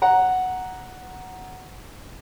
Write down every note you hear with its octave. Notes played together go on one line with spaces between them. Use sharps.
F#5 A#5